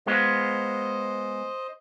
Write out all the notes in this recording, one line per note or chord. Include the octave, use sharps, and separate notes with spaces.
G#3 B3 F4 C5 D#5